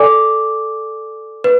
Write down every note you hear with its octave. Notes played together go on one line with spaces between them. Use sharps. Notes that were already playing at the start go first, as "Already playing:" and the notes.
Already playing: A4 D5 G#5 D6
B4